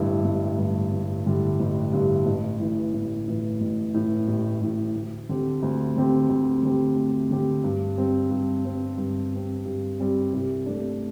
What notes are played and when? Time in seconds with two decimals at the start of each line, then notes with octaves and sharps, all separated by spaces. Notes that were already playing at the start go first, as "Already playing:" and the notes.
Already playing: A1 G2 D3 G3 E4
0.24 A1
0.58 G2 D3 G3 E4
0.92 A1
1.26 G2 D3 G3 E4
1.60 A1
1.93 G2 D3 G3 E4
2.26 A1
2.59 A2 E3
2.93 A1
3.28 A2 E3
3.61 A1
3.94 A2 E3
4.28 A1
4.61 A2 E3
4.96 D2
5.29 D3 C4 G4
5.62 D2
5.96 D3 C4 G4
6.29 D2
6.63 D3 C4 G4
6.96 D2
7.31 D3 C4 G4
7.64 G2
7.98 G3 C4
8.31 G2
8.65 G3 C4
8.98 G2
9.32 G3 C4
9.65 G2
10.00 G3 C4
10.33 C2
10.66 C3 A3 D4